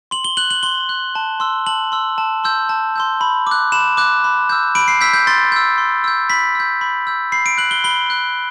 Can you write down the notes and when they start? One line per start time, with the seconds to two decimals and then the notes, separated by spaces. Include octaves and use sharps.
0.11 C6 F#7
0.24 G7
0.37 F#6 F#7
0.51 F#7
0.63 C6 G7
0.89 F#6
1.15 A5
1.40 C6 E6
1.66 A5 F#7
1.92 C6 E6
2.18 A5
2.44 C6 E6 G6
2.69 A5
2.96 C6 E6 G6
3.21 B5
3.47 D6 F#6
3.72 B5 E7
3.97 D6 F#6
4.24 B5
4.49 E6 G6
4.75 B5 D7
4.88 C7
5.01 E6 G6 B6
5.14 G6
5.27 C6 A6
5.52 E6 G6
5.78 C6
6.04 E6 G6
6.30 B5 B6
6.55 E6 G6
6.81 B5
7.07 E6 G6
7.32 B5 C7
7.46 D7
7.58 F#6 F#7
7.71 G7
7.84 B5 G7
8.10 F#6